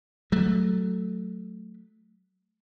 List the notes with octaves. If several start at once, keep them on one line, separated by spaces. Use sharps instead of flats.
F#3 A3